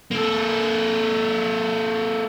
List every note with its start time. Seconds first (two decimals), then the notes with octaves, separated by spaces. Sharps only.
0.11 A#3 A4